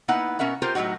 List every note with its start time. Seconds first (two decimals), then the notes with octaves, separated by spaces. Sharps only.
0.08 A#3 B3 D#4 E4 F#5
0.39 B2 C#4 A#4 E5 F#5
0.62 F4 G4 A#4 C5
0.75 A2 C#3 F#3 D#4 F#4